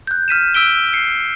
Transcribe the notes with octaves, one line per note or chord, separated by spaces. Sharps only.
F#6 G6
F6 B6 D#7 E7
E6 B6 D7 G7
C7 C#7